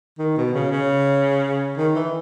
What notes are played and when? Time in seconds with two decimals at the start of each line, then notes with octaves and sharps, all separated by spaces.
0.18 D#3
0.37 B2
0.54 C#3
0.71 C#3
1.77 D#3
1.95 E3